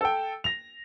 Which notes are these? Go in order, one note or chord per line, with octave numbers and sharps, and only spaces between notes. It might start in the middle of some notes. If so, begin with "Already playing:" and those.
A4 G5
A#6 F7